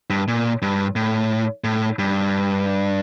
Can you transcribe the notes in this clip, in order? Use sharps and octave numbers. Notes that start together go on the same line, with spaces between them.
G2
A#2
G2
A2
A2
G2